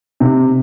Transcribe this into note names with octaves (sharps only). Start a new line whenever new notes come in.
C3